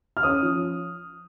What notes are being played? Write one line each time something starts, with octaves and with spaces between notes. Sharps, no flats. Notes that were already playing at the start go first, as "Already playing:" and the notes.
F6
C#4 D#6
F3